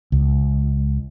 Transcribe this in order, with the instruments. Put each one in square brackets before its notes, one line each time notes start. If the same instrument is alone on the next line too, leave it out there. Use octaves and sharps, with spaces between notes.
[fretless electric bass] C#2